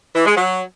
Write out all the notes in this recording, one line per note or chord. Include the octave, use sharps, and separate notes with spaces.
E3
G#3
F#3